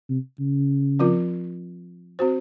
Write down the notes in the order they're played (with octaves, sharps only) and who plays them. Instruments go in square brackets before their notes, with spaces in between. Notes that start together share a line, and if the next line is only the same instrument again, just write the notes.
[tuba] C3
C#3
[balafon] F3 C4 F4 A#4
C4 F#4 C5